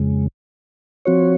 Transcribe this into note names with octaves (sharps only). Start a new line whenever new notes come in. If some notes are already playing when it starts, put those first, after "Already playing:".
Already playing: F2 C#3 G#3
F3 C4 F#4 C#5